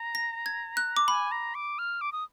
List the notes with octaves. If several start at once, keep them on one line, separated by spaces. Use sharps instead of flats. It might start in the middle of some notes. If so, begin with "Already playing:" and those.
Already playing: A#5
A#6
G#6
F#6
D6
G#5 B5
A#5
D6
F6
D6
D#6